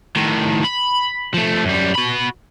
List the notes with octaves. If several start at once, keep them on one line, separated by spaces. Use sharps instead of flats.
A2 D#3
B5
F3 A3
F#2 G3
F#4 B5